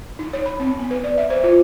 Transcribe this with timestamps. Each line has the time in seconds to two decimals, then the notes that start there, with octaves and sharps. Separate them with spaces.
0.19 D#4
0.33 C#5
0.46 B5
0.60 C4
0.79 B3
0.91 B4
1.04 D5
1.18 E5
1.30 C5
1.44 F4